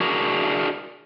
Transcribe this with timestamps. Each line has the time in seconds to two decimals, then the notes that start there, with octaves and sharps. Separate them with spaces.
0.01 D4 F#4 G#4 A#4